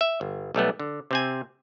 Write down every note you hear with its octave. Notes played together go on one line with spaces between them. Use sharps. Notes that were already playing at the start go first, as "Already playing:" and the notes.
E5
G1
B1 G3 A3 B3
D3
C3 C4 G#5